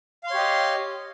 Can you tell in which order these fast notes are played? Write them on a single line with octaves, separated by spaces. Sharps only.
F5 C6 C#5 G4 D#5